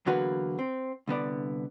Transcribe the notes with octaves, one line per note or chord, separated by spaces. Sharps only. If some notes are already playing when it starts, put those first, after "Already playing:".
E2 D3 F#3 A#3 F#4 B4
C4
C2 D3 B3 D5